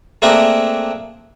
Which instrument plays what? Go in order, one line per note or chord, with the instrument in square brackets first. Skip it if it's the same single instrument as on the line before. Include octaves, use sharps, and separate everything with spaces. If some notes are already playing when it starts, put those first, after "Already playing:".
[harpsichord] A3 A#3 C4 D4 G#4 A#4